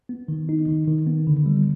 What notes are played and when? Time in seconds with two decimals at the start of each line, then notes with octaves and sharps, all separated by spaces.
0.09 B3
0.28 D#3
0.49 D#4
0.68 D#3
0.87 D#3
1.07 B3
1.27 D3
1.46 G3